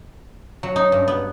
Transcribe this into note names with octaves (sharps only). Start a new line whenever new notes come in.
F#3
D#4
G2
B3